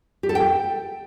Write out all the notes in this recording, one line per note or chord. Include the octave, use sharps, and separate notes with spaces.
G4
A4
G5